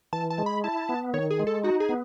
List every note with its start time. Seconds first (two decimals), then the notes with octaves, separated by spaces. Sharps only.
0.13 E3 A5
0.30 A5
0.38 G#3
0.46 B5
0.64 E4 A5
0.89 B3
1.14 D#3 C#5
1.30 G#4
1.39 G#3
1.47 A4
1.64 D#4 F#4
1.80 G#4
1.89 B3